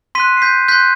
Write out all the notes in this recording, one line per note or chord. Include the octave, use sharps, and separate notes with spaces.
C6 F#6 B6 D#7
C7
G6 B6
C6 F#6 G6 B6